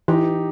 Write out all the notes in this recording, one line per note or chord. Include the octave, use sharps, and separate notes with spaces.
E3 D#4 G4